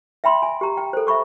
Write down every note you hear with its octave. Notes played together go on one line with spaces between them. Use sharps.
E5 G5 B5 C6
G#5
G4 A#5
G5
A4 C5
E5 B5 C#6 D6